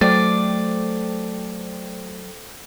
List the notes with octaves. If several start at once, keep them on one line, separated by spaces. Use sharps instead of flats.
F#3 A3 A4 C5 D5 G5